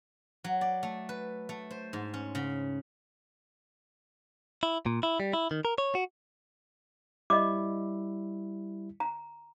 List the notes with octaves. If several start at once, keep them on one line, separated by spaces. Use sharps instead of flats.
F#3
D5
A3
B4
A3
C5
G#2
C#4
C#3
E4
A#2
E4
G3
E4
D#3
A#4
C#5
F#4
G3 E4 D#5 D6
A#5